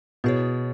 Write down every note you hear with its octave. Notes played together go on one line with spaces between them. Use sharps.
B2 B3 E4 G#4 C#5